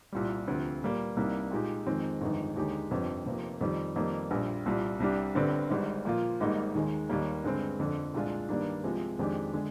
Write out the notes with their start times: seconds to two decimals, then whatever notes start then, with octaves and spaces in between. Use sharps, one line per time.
0.12 C2 A#2 G3
0.47 D2 C3 F3
0.82 A#2 G3 A#3
1.17 C2 C3 G3 A#3 D#4
1.51 A#2 G#3 D#4 G4
1.87 F2 D#3 G#3 C4
2.21 G1 F2 D#3 G#3 D#4
2.56 D#2 D3 G#3 D#4 G4
2.91 G1 F2 C3
3.25 F1 F2 C3 F3 A#3
3.61 F2 D#3 G3
3.96 F2 D#3 G3 A#3 D#4
4.30 A#1 A#2 G3
4.66 C2 A#2 G3
5.00 C2 C3 G3 D4 G4
5.35 G1 G2 D3 G3 C4
5.70 G#1 G#2 G3
6.05 A#2 F3 A#3 F4
6.40 G#1 G#2 G3 A#3 D#4
6.75 D#2 D#3 G#3
7.09 D#2 D#3 G3 A#3
7.44 G2 D3 G#3 C4
7.80 F2 D3 F3
8.14 C2 A#2 G#3 D4 F4
8.49 G2 D#3 G3 A#3 D4
8.84 C2 C3 F3 G#3
9.19 F2 D#3 G#3 D4 G4
9.53 D3 G#3